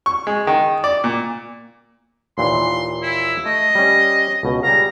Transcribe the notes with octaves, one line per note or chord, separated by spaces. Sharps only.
C#6
G#3
D#3
D5
A#2
D#2 A#2 E3 C6
E4
A3 D#5
G3 C#4
C#2 B2
G3 G#4 F5 A#5